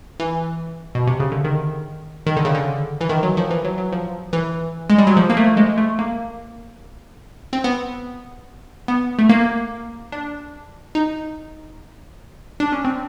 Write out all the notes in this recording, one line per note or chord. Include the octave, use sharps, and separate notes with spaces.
E3
B2
C3
C#3
D3
D#3
D#3
D3
C#3
D3
E3
D#3
F#3
F3
E3
F#3
F#3
F3
E3
G#3
G3
F#3
F3
A#3
A3
G#3
A3
A#3
C4
B3
B3
A3
A#3
D4
D#4
D4
C#4
C4